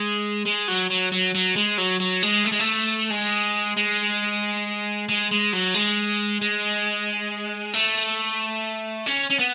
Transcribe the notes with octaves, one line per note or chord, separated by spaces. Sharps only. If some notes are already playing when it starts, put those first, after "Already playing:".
Already playing: G#3
G#3
F#3
F#3
F#3
F#3
G#3
F#3
F#3
G#3
A3
G#3
A3
G#3
G#3
G#3
G#3
F#3
G#3
G#3
A3
C#4
C#4
B3